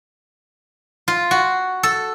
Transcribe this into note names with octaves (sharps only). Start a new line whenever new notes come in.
F4
F#4
A4